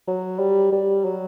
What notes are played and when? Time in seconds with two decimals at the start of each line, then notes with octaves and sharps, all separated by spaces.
0.07 F#3
0.39 G3
0.72 G3
1.05 F#3